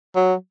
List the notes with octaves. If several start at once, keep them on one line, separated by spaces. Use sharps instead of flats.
F#3